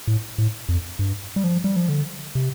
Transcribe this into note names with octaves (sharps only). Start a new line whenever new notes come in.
A2
A2
F2
G2
G3
F3
G3
F3
D3
C3